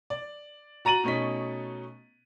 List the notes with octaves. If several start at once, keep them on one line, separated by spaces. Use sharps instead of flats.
D5
F#4 A#5 A6 D#7 F#7
B2 A3 C#4 D#4 B6